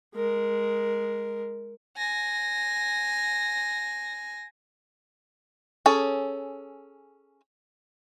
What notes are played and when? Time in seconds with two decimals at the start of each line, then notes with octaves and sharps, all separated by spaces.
0.15 G#3 A#4
1.97 G#5 A#6
5.86 C#4 G#4 A4